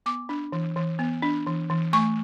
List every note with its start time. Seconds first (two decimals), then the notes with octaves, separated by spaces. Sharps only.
0.06 B3 D6
0.29 D4
0.52 E3
0.76 E3
0.99 B3
1.22 D4
1.46 E3
1.70 E3
1.93 A3 C#6